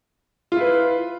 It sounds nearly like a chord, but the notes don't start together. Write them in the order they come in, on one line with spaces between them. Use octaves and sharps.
F4 E4 B4